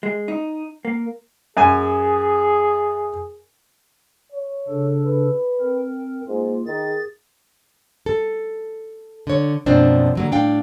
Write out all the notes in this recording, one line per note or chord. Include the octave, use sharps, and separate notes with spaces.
G#3
D#4
A#3
F#2 G#4 G#5
C#5
C#3 D4 A4
B4
C4 A#4
G#2 A#3 F4
D#3 G#4 A6
A4
D3 C#5
F#2 B2 F3 A#3 C4 D4
D3 F#3 A#3
A2 D4 F5 G5